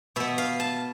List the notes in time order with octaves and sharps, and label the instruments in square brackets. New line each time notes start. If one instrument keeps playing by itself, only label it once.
[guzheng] B2 B3 E5
F5
A5